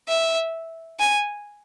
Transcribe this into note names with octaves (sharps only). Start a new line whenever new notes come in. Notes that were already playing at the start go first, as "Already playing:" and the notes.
E5
G#5